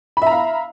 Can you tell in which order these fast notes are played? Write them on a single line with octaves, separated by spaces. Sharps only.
B5 E5 A#5 F5